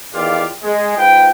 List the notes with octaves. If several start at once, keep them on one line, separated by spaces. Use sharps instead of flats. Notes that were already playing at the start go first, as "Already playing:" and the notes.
E2 D#3 F4 G4 D5 F5
G#3
G#2 F4 B4 G5